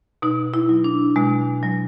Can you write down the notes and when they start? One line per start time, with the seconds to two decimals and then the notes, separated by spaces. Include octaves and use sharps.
0.22 B2 D#4
0.54 E4
0.69 F#3
0.84 D4
1.16 B2 G#3
1.63 F#3